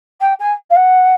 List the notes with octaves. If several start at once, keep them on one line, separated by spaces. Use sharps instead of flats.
G5
G#5
F5
F#5